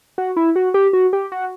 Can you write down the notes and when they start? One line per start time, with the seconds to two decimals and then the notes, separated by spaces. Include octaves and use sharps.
0.18 F#4
0.37 E4
0.56 F#4
0.74 G4
0.93 F#4
1.13 G4
1.32 F#4